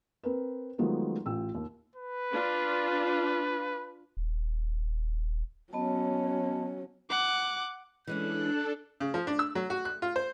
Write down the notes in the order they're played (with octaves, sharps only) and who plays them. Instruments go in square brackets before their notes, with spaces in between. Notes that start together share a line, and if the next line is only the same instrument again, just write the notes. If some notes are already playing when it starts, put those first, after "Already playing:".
[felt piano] C4 A#4 B4
D#3 F3 F#3 G#3 A3 B3
A1 F4 G5 E6
D#2
[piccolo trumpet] B4
[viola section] D4 F4
[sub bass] D#1
[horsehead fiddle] F#3 C#4 [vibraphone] B3 D#5 A5
[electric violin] F#5 D6
[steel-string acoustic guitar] E3 G#3 C#4 [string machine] D4 A4 [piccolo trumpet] F#6
[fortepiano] C#3
F3
D4
E6
F#3
F#4
F#6
F4
C5